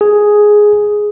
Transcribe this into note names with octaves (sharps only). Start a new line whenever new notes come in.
G#4